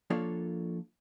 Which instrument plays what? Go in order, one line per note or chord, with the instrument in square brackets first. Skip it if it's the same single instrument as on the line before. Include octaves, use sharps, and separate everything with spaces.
[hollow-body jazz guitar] F3 A#3 D4 F4 A4 C#5